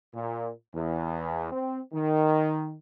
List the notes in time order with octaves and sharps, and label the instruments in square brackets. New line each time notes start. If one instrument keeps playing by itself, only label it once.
[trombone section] A#2
E2
C4
D#3